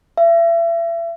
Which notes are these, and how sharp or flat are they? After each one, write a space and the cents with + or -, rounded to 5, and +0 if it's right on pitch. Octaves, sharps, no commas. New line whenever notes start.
E5 +35